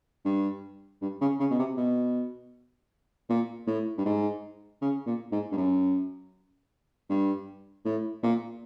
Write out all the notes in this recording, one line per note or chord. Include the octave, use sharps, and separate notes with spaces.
G2
G2
C#3
C#3
B2
C3
B2
A#2
A2
G2
G#2
C#3
A#2
G#2
G2
F#2
G2
A2
A#2